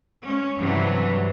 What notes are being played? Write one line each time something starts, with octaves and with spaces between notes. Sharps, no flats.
C#4
G2 C3 E3 F#3